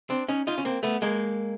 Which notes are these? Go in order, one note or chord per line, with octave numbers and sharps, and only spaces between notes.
C4 D4
C#4 D#4
D#4 F4
C#4
A#3 C4
A3 B3
G#3 A#3